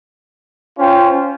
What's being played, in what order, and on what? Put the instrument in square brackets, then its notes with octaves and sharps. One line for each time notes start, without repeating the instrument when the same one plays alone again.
[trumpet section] C#4 F4 C5 G5